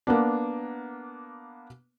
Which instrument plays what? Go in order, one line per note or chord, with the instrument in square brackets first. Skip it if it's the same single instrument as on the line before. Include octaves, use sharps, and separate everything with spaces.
[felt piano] A#3 B3 D4